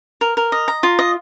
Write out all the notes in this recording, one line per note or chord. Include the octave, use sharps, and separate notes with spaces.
A#4
A#4
D#5
A#5
F4
D#5